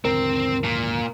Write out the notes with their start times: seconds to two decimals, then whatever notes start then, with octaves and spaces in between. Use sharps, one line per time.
0.05 D#2 G#2 D3 C4 A#4
0.64 A#2